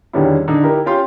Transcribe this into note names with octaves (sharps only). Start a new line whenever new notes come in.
E2 D3 D#3 G3 C#4 E4
D3 D#4
D#4 E4 G4 A#4
C#4 F4 G4 F5 G5 C6